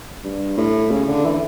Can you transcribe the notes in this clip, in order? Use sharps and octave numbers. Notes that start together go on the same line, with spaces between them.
G2
A2
C#3
D3
E3